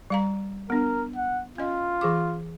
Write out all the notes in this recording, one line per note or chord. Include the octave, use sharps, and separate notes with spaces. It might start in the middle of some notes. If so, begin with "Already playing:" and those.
G3 F5 A#5
B3 D4 A#4
F#5
C#4 F4 D#5
E3 G#4 D6